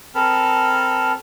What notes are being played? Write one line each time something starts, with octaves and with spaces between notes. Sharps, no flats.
C4 A4 A#4 A5 B5 F6